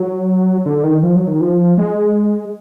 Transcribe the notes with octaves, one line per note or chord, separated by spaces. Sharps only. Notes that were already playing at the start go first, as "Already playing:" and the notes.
Already playing: F#3
D3
D#3
F3
F#3
D#3
F3
G#3